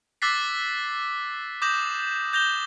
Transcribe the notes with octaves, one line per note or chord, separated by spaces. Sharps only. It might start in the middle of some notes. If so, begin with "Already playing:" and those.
D6 E6 F#6 A6 B6 C7
D6 D#6 G6 A#6 E7 F#7
G6 A#6 F7 G7